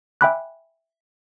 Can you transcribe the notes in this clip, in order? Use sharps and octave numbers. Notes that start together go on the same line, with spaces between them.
E5 G5 G#5 B5 D6 F#6